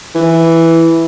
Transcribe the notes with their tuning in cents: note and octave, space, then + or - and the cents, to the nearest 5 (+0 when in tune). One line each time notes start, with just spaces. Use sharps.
E3 +0